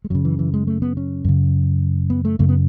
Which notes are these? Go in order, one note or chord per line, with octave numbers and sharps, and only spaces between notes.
G#3
F#2 C#3 F#3
E3
E3
G#3
A3
B3
C#4
F#2 C#3
B3
A3
F#2 C#3 A3
B3